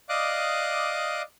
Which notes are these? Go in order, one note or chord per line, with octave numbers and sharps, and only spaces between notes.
D5 D#5 F5 D6 D#6 F#6